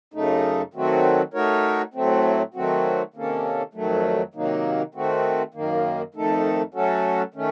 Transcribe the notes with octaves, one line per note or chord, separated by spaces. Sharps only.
F#2 C#3 A3 D#4
D#3 F#3 A3 C4 F#4
A3 D#4 F#4 A#4 C#5
A2 F#3 A3 C4
D#3 F#3 A3 C4 F#4
C3 D#3 A#3 C#4 A4
F2 D#3 F#3 A3
C3 D#3 F#3 A#3 D#4
D#3 A3 C4 F#4
F#2 D#3 A#3
F2 D#3 A3 D#4 A4
F#3 A3 C#4 F#4 A4
D#3 A3 C#4